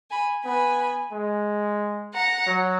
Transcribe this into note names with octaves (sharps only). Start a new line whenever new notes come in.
G#5 B5
B3 G#5 B5
G#3
F#5 A#5
F#3